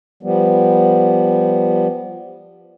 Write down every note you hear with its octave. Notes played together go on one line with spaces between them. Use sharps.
F3 G3 B3